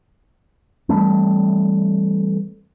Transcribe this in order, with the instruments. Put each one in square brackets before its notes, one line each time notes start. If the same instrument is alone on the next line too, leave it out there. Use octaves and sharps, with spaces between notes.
[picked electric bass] E3 G3 A3 C4